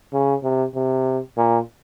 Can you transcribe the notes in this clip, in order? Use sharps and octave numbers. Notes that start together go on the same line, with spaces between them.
C#3
C3
C3
A#2